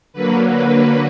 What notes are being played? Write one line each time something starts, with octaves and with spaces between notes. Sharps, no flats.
D3 F#3 A#3 B4
B4